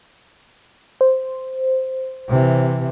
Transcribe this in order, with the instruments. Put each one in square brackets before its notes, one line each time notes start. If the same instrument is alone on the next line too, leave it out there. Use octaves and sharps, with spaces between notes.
[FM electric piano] C5
[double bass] C3 E3